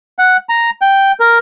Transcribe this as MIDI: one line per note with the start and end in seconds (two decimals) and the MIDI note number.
0.19 0.37 78
0.49 0.70 82
0.82 1.12 79
1.20 1.39 70